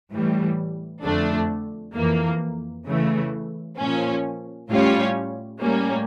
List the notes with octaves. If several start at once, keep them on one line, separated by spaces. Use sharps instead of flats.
A2 E3 G3
F2 D3 A3 D4
F2 E3 A#3
C#3 E3 A3
A#2 F3 C#4
A2 G3 C#4 F4 C#5
A2 G3 A#3 C#4